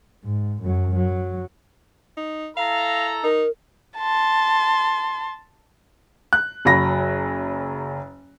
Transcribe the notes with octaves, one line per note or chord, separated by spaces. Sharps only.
G#2
F#2 F#3
F#3
D#4
E4 A4 F5 A#5
D#4 A#4
A5 C6
F#6
F#1 F#3 B5 A#6